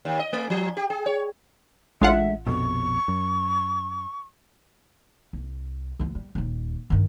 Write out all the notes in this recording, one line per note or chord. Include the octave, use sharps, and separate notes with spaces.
D#2
D#5
A3
F3
G4
G#4
C#5
A1 G#3 A3 D4 F4 E5 F#5
A#1 F2 B2 C#6
F#2
C2
D2 E3
G3
D#1 D#2
G2 D#3